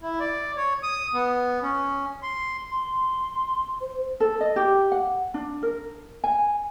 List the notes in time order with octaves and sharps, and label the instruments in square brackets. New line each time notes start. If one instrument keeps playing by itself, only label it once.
[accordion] E4
D5
C#5
D#6
B3
C#4
C6
[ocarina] C6
C5
[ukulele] A4
D#5
G4
F#5
D4
A#4
G#5